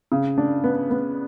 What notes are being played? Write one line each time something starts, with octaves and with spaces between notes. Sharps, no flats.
C#3
D4
B3
B3